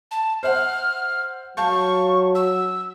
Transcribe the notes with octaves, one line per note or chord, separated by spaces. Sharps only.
A5
C5 E5 F#5 F6
F#3 F5 A5 C#6 G6
E6